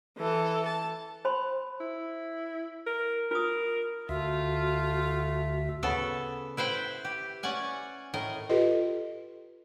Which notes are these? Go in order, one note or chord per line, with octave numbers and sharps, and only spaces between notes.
E3 A4
A5
C5 B5 C6
E4
A#4
F4 A#4 D#6
D2 A3 F4 F#4 E5
C#3 B3 A4
E4 B4 C5 G5
G4
C#4 D5 F#5 G#5
A2 A#4 D#5
F4 G4 A4 B4 D#5